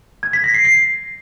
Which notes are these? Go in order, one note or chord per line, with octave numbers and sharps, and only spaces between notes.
G#6
B6
A#6
C7
C7